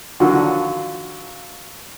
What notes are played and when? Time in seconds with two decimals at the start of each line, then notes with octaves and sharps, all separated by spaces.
0.20 D3 D#3 F3 F#3 F4 F#4